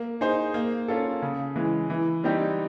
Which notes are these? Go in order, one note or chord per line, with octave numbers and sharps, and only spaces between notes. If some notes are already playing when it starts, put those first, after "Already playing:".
Already playing: A#3
D#4 G#4 C5
A#3
C#4 F4 A4
C#3
E3 G#3
E3
G3 C4 D#4 G4